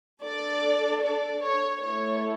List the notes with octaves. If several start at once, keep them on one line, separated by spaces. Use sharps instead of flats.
D4 A4 D5
D5
C#5
A3 E4 A4 C#5